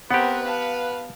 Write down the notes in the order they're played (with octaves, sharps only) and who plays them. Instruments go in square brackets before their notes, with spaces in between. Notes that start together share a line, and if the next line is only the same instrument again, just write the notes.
[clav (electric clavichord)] B3 G4 [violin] C4 A#4 [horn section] B4 [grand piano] F#5
[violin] F5 A5